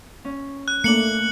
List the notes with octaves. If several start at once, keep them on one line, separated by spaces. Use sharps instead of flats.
C#4
F#6
A3 A#3 D4 C#7 F#7